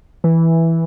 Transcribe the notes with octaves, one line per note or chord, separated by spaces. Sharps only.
E3